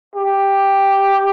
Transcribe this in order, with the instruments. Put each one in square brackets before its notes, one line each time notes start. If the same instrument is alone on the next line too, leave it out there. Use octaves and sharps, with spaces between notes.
[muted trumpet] G4